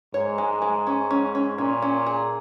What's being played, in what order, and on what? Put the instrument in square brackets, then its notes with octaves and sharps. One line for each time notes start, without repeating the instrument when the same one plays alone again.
[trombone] G#2 [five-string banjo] C#5
[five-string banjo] G#3
G#3
C#4
C#4
C#4
[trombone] A#2 [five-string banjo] C#4
[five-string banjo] C#4
G#4